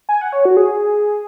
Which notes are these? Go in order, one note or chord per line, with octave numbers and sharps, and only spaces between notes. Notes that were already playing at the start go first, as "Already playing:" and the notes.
G#5
F#5
C#5
F#4
G#4